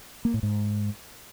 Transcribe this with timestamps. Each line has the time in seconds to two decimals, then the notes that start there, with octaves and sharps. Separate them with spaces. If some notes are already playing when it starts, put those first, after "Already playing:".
0.25 A#3
0.34 A2
0.43 G#2